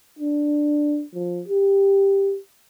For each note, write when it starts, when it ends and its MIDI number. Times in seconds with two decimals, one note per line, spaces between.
0.19 1.04 62
1.14 1.43 53
1.48 2.38 67